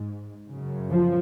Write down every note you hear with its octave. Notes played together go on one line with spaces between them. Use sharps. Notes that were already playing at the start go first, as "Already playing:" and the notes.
Already playing: G#2
F#2 C#3
F3